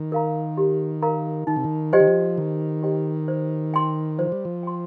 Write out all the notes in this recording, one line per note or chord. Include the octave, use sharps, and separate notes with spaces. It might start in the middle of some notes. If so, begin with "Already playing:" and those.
Already playing: D#3
A#4 F5 A#5
G4
A#4 F5 A#5
D#3 D#4
C3
D#3
F3 G4 C5 D#5 G5
D#3
F3
D#3 D#4
G4 C5 D#5 G5
C5
G5 C6
F3 C5
G3
F3
G5 C6